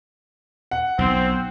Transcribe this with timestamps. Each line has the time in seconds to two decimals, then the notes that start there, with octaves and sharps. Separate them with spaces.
0.71 F#5
0.98 B1 C4